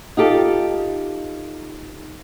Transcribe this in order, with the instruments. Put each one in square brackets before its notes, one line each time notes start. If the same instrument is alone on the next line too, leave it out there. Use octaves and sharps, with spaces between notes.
[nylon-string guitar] D#4 F4 G4 A4